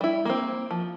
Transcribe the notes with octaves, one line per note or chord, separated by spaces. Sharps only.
G3 E4
A#3 C4
F3